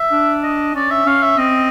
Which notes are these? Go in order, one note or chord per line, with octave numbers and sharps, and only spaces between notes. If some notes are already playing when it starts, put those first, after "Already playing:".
Already playing: E5
D4
D#5
C#4 D5
E5
C#4 F5
E5
C4 D#5